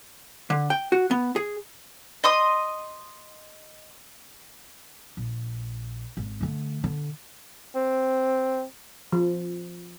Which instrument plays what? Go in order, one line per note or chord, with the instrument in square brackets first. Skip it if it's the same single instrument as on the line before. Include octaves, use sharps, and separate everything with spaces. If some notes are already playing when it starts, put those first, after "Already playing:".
[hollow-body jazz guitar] D3
G5
F#4
B3
G#4
[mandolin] D#5 C6 D#6
[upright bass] A#1
G#1
D3 A3
D3
[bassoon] C4
[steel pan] F3